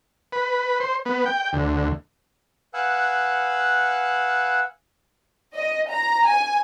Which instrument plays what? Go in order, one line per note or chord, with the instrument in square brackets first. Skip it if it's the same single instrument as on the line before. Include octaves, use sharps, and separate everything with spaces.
[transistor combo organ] B4
C5
B3
G5
D2
[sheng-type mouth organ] B4 F5 F#5 G#5 E6 F#6
[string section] D#5
A#5
G#5